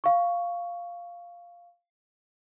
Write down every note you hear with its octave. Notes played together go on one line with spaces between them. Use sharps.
F5 C#6